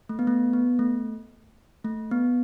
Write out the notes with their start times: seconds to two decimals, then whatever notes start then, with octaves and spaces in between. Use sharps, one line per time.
0.09 A3
0.19 B3
0.27 A3
0.53 B3
0.79 A3
1.85 A3
2.11 B3